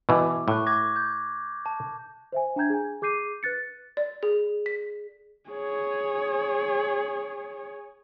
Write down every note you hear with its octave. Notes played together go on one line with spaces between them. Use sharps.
B2 E3 D6
A2 C#6 F#6
D6 G#6 A#6
G6
A5
C5 E5 G#5
D4 G5 A#5 G6 G#6
G#4 G#5
G#4 D6 G6 C7 D#7
B4 F#6 A6 C#7
D5
G#4
B6
G#4 C#5